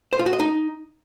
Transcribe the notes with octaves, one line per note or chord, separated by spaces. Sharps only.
C5
F4
F#4
D#5
D#4